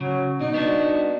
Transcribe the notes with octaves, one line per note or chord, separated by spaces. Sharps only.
C#3 F#3
B2 D#4
B3 D4 F#4